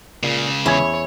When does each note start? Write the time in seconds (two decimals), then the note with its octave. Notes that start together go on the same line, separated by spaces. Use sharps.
0.23 C#2 A#2 C#3
0.66 E2 E4 C#5 G#5